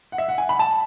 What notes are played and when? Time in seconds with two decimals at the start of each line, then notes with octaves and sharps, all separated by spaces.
0.12 F#5
0.18 E5
0.29 F#5
0.38 G#5
0.49 B5
0.59 A5